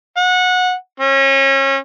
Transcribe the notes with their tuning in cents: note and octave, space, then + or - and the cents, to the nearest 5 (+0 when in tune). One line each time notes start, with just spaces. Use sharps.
F#5 -20
C#4 -30